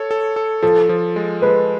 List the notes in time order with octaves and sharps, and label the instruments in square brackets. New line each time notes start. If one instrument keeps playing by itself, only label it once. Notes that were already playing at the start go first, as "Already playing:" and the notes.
Already playing: [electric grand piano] A4 C#5
A4
A4
[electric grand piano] F3 [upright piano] A4
[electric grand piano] F3
G#3
[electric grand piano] G#3 [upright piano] B4